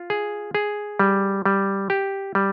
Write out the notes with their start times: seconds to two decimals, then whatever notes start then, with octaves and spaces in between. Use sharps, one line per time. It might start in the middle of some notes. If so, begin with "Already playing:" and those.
Already playing: F4
0.10 G#4
0.55 G#4
0.99 G3
1.46 G3
1.90 G4
2.35 G3